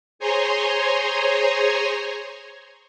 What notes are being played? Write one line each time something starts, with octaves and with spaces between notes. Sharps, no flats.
G#4 C5 C#5 G#5 A#5 C6